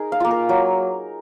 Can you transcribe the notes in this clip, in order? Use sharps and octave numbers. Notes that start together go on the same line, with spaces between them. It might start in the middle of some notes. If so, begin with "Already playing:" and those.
Already playing: D#4 G#4 A#4
F5
A#3 F4
A#4
F#3